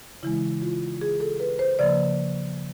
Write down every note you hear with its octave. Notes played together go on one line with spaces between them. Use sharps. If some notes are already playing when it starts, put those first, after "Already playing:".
C#3 E3 G#3 E4
F4
G#4
A4
B4
C5
C#3 F3 A#3 D5